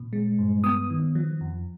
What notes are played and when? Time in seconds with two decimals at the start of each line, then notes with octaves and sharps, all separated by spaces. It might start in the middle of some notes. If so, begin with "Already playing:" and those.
Already playing: A#2
0.13 G#3
0.39 G2
0.64 B3 D#6
0.90 D#3
1.15 F3
1.41 F2